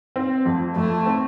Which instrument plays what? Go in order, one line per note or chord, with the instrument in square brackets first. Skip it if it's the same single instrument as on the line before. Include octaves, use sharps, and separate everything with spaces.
[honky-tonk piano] C4
F2
[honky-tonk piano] F2 [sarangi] A3
[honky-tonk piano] C4